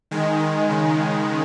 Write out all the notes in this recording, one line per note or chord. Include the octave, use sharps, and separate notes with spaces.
D#3 G#3
D#3
C#3